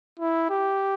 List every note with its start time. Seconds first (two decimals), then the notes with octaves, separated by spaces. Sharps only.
0.19 E4
0.50 G4